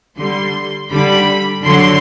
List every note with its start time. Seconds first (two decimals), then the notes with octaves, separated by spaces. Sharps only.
0.18 D3 G3 C6
0.91 D3 G3 B5
1.64 D3 F#3 C6